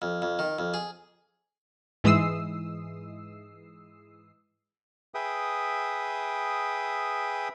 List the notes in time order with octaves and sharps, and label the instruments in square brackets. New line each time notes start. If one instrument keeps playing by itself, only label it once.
[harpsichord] F2
F2
D#3
F2
G#4
[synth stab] G#2 E3 G#3 D#6 E6 C7
[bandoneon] G#4 B4 E5 G5 D#6